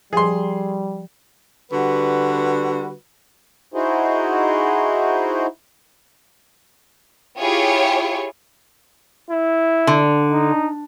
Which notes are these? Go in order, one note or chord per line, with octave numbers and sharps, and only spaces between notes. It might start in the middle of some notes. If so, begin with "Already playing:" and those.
F3 G3 G#4 C6
D3 G3 F#4 B4
D#4 E4 F#4 G#4 C5
E4 F4 G4 G#4 C#5
E4
D3
D#4